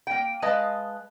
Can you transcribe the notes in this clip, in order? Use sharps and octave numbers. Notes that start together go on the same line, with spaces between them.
A#3 G5
G#3 B4 D#5 F5 A5